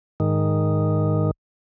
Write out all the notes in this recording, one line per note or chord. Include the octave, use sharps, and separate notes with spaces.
G#2 D#3